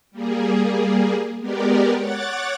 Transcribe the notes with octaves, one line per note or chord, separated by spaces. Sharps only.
G3 A#3 G#4
G#3 B3 G4 A#4 D5
C#5 F#5 D6 F#6 A6